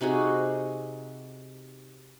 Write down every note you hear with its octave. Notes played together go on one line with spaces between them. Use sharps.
C3 D#4 F#4 G#4